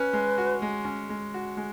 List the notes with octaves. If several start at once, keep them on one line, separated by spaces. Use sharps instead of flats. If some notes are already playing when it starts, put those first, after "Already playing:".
Already playing: C#4 B4
G#3
F#4
G#3
C#4
G#3
F#4
G#3